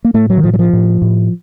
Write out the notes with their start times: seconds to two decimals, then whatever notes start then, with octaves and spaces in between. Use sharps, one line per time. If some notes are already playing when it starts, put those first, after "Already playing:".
0.05 A#3
0.14 A2 A3
0.30 F#3
0.37 D#3
0.44 A2 F3
0.53 F#3
0.59 F3
0.73 A2
1.02 A2